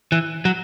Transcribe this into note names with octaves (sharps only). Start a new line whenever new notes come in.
E3
F#3